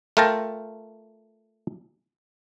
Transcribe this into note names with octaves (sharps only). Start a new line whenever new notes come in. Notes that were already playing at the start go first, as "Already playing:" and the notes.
A3 F4 A#4 G5 A5 A#5